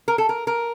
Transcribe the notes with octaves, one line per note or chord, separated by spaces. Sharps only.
A#4
A4
A#4
A#4